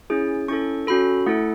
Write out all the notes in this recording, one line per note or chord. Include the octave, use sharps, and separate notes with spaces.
C#4 E4 G#4
C#4 E4 A4 C#6
C#4 F#4 A4 B5
A3 E4 A4 F#5